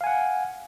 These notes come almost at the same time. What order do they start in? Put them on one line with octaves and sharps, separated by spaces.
F5 G#5 F#5